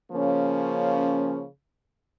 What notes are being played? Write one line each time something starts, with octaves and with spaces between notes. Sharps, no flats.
C#3 F3 A#3 C#4